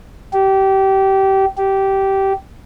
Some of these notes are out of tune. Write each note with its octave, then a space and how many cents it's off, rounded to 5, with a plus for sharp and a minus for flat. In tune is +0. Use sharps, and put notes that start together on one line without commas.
G4 -25
G4 -15